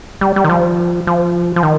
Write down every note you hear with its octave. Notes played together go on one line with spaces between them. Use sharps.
G3
G3
D#3
F3
F3
F3
D#3